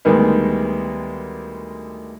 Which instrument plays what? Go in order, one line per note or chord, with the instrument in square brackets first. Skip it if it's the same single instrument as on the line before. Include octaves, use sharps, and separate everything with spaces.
[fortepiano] D2 D#3 G3 G#3 B3